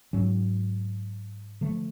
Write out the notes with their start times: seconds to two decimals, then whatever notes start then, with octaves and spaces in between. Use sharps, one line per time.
0.13 G#2 F#3 C#4
1.61 D3 F3 A3